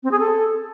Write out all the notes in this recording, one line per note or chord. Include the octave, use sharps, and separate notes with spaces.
C4
G#4
A4